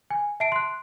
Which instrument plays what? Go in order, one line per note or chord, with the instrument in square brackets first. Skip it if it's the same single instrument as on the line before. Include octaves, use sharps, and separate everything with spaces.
[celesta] G#5
E5 A5 C7 D7
C6 F#6